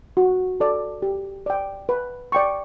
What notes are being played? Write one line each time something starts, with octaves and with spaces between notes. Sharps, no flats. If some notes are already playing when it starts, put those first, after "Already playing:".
F#4
A4 D5
G4
D5 G5
B4
D5 G5 C#6